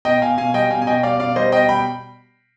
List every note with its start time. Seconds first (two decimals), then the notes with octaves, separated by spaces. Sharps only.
0.05 B2 D#5 G5
0.22 B2 F5 G#5
0.38 B2 F5 G#5
0.54 G3 D#5 G5
0.70 B2 F5 G#5
0.82 G#5
0.87 B2 D#5 G5
1.03 G3 D5 F5
1.20 B2 D5 F5
1.36 G3 C5 D#5
1.52 B2 D#5 G5
1.69 G3 G5 B5